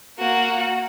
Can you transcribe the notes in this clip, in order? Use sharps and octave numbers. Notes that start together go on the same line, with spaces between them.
A#3 F#4